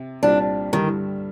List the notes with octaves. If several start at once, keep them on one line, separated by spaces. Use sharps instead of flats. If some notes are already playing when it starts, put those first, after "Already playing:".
Already playing: C3
C2 A#2 G3 C4 D4
G2 D3 D#3 G3